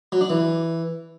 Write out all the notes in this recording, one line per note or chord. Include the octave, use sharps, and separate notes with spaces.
F#3
D4
E3